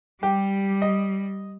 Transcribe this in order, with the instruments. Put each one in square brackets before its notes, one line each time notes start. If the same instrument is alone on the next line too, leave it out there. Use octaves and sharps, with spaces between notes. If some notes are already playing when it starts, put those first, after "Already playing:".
[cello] G3 [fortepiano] G4
[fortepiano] D#5